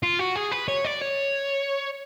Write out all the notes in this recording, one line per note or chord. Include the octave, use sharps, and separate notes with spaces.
F4
F#4
G#4
B4
C#5
D5
C#5